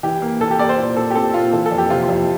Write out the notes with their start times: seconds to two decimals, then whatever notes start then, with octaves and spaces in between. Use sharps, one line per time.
0.03 E3 G4
0.22 A#3
0.41 E3 A4
0.51 G4
0.59 A#3 D5
0.69 C5
0.78 A#2
0.96 A#2 A4
1.10 G4
1.15 C4 A4
1.34 A#2 F4
1.52 E3 A4
1.66 A4
1.72 F2
1.78 G4
1.90 C3 F4
2.02 F4
2.09 F2